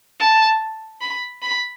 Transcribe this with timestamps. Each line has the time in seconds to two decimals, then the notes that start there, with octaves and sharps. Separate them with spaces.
0.20 A5
1.01 B5
1.42 B5